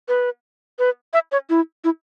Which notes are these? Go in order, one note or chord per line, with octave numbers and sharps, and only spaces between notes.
B4
B4
E5
C#5
E4
E4